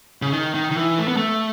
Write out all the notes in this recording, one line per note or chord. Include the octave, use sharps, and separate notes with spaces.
C#3
D#3
D#3
D#3
E3
A3
B3
A3